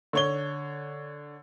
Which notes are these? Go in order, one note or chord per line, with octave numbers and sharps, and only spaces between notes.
D3 C#5 G7